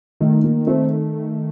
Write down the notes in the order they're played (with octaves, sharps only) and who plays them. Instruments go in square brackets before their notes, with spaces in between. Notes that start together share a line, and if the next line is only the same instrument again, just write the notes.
[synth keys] D#3 [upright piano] A3
[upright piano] A#3
[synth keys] A3 [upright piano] C4